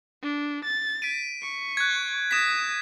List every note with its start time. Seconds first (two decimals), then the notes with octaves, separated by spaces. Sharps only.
0.23 D4
0.64 A6
1.02 B6 D7 D#7
1.42 C#6
1.77 F#6 G#6
2.31 D#6 A#6 B6 E7